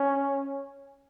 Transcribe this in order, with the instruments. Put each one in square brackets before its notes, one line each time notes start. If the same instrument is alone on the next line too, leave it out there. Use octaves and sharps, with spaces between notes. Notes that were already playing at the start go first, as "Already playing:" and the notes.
Already playing: [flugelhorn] C#4